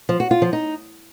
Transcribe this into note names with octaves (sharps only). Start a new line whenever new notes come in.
F3
F#4
F4
F3
D#4